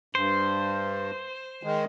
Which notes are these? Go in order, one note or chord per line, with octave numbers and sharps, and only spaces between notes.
G2 C5
D#3 G#3